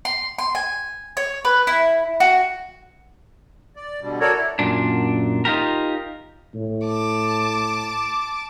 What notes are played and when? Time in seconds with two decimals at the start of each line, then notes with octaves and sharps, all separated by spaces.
0.05 C6
0.38 C6
0.55 G#5
1.17 C#5
1.45 B4
1.67 E4
2.20 F#4
3.76 D5
4.01 B2 D3 G3
4.20 F#4 A4 A#4 C#5 D5
4.35 E4
4.59 F#2 A#2 D4
5.45 D#4 F4 G4 A#4
6.55 A2
6.85 A5 D6